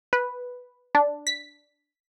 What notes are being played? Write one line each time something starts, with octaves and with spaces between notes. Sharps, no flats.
B4
D4
B6